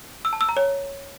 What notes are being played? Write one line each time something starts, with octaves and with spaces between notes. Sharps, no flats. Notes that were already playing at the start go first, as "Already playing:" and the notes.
E6
A5
E6
A#5
C#5